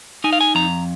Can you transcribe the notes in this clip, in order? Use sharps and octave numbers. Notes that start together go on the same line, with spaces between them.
D#4 G#5
F5
G#5
F2 A#5